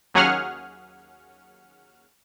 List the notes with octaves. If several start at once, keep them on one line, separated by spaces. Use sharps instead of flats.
D#2 F#3 C#4 G#4 F#5 F6